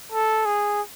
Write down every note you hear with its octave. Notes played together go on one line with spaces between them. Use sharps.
A4
G#4